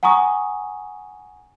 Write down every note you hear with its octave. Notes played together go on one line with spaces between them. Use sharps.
F#5 G#5 A#5 C#6 D#6